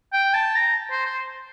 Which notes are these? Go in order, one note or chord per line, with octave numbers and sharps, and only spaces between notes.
G5
A5
A#5
C5
C5